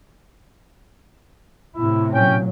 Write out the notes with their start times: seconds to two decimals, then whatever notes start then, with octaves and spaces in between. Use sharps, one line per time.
1.76 A2 C3 E4
2.13 A#2 F#3 C#4 G5